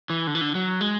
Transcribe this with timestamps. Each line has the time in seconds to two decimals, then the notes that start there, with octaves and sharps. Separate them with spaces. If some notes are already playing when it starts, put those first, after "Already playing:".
0.10 E3
0.27 D3
0.35 E3
0.41 D3
0.55 F#3
0.81 G#3